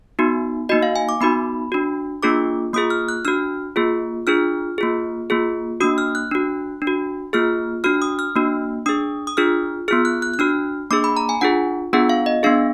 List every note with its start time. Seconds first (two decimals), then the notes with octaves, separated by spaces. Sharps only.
0.19 B3 D#4 F#4
0.69 A#3 D#4 F#4 D#5
0.83 F5
0.96 G#5
1.09 D6
1.21 B3 D#4 F#4 B5
1.72 D4 F#4
2.23 A#3 D4 F4 G#4 D6
2.73 A#3 F4 G#4 D#6
2.90 F6
3.08 F#6
3.25 D4 F#4 F6
3.76 A#3 F4 G#4
4.27 D4 F4 G#4 F6
4.78 A#3 F4 G#4
5.30 A#3 F4 G#4
5.80 A#3 D4 F#4 D#6
5.98 F6
6.15 F#6
6.31 D4 F#4
6.82 D4
6.87 F#4
7.33 A#3 F4 G#4 F6
7.84 D4 F#4 F6
8.02 D#6
8.19 F6
8.36 A#3 D4 F#4
8.86 D4 G#4 D#6
9.27 D#6
9.37 D4 F4 G#4 F6
9.88 B3 F4 G#4 F6
10.05 F#6
10.22 F#6
10.34 F#6
10.39 D4 F#4 F6
10.91 A#3 D4 G#4 D6
11.04 B5
11.17 A#5
11.29 G#5
11.41 D4 F4 G#4 F#5
11.93 B3 D4 F4 G#4 F#5
12.09 F5
12.26 D#5
12.43 B3 D4 G#4 F5